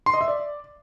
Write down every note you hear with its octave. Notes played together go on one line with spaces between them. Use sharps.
C6
D#5
E5
D5